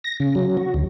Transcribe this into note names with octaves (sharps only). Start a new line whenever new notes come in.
A#6
C#3
F#3
F#4
D2